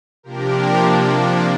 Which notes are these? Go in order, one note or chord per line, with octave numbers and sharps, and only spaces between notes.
C3 F3 A#3 D4 G4 A#4